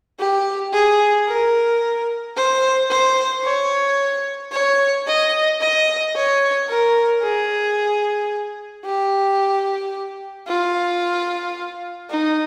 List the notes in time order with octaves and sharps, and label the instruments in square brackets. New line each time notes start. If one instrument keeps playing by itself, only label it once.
[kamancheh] G4
G#4
A#4
C5
C5
C#5
C#5
D#5
D#5
C#5
A#4
G#4
G4
F4
D#4